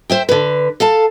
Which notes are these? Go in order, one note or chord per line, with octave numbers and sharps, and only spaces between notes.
C5 E5 G5
D3 B4
A4 F5 A5